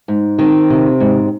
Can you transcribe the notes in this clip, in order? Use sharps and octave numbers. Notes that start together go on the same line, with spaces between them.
G#2
D#3 C4
C3
G#2